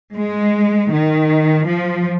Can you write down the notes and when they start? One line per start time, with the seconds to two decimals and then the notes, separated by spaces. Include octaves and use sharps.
0.14 G#3
0.92 D#3
1.67 F3